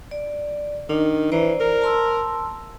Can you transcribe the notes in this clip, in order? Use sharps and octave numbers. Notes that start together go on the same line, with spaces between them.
D5
D#3 D4
E3 C5 D5 A#5
A#4
A5 C6 E6